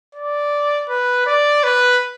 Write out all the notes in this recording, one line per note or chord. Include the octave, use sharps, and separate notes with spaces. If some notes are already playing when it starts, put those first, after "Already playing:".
D5
B4
D5
B4